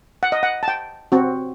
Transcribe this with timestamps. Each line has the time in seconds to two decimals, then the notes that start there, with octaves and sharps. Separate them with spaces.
0.23 F#5
0.32 D#5
0.43 F#5
0.63 A5
0.68 G5
1.12 C4 F#4